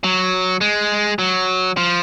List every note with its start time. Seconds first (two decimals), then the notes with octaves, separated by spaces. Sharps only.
0.04 F#3
0.61 G#3
1.19 F#3
1.77 F3